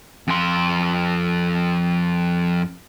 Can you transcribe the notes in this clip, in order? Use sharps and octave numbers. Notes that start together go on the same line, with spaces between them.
F2 C6